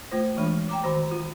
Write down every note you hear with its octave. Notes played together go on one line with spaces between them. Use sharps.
A3 F4 C5
E3 G#3 D4
G5 A#5 D6
D#3 F#4 C5 A#5
F4